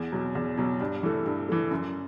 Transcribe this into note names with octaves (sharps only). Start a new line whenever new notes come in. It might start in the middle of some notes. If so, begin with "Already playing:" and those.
Already playing: E2
B2 F#3
E2
B2 F#3
G2
E3 A3
G2
E3 A3
F#2